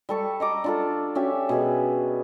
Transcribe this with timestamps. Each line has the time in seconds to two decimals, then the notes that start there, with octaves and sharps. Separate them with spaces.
0.09 G3 A4 C#6
0.40 D#5 A#5 D6
0.64 D4 F4 A4
1.15 C#4 F#4 G4 E5
1.49 B2 G#4 B4